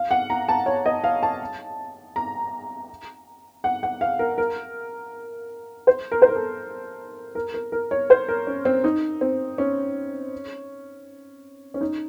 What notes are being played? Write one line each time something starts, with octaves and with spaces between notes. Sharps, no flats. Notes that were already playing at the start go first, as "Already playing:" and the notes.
Already playing: F5
F#5
A#5
A5
C#5
D#5
F5
A5
A#5
F#5
F#5
F5
A#4
A#4
C5
A#4
C5
A#4
A4
A#4
A#4
A#4
C#5
C5
A#4
C#4
C4
D#4
C4
C#4
C#4
D#4